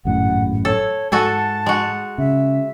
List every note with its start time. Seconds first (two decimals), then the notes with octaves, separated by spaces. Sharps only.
0.05 G#1 F#2 A2 F#5
0.65 A4 C#5
1.12 G#2 F#4 A4 G#5 A5
1.66 G#3 F#4
2.18 C#3 E5